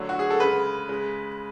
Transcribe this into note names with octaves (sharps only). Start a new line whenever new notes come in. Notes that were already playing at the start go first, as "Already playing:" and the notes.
Already playing: D3 F#3 A3
F#4
G#4
A4
C#3 G#3 B4
C#3 G#3